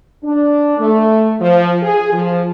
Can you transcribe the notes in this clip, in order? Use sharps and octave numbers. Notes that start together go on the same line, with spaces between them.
D4
A3
F3
G#4
F3